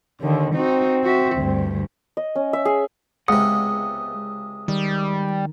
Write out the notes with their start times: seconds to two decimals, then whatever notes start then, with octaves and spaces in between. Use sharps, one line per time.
0.21 D#2 D3 D#3
0.55 C4 D#4 F#4
1.04 F#4 E5
1.36 D2 G2
2.17 D#5
2.35 C#4
2.53 E5
2.65 G#4
3.28 C#2 C3 G#3 B3 F#5 D#6
4.68 D#3 G3